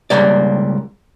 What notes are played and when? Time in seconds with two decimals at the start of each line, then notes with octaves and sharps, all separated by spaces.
0.10 C#2 G2 G3 A#3 D5